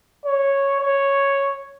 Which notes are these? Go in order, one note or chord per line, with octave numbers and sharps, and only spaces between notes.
C#5
C#5